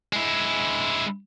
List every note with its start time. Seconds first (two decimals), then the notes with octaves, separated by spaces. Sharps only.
0.13 G#3 E4